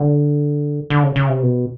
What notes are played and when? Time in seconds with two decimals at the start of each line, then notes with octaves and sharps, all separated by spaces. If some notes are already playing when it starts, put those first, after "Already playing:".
Already playing: D3
0.90 D3
1.03 C#3
1.16 C#3
1.29 C3
1.43 B2